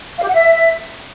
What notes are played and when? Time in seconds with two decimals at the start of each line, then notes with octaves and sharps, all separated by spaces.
0.17 F5
0.22 G4
0.27 F#5
0.33 E5